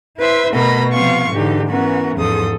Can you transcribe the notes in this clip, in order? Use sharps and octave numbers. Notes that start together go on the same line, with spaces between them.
E4 B4 C5 E5
B2 A3 A#4 D#5 B5 A#6
C3 F3 B3 F4 F5 C#6
G#2 D3 E3 D#4 G4
E3 B3 C#4 F#4 A#4
E2 G#2 F3 A4 D#6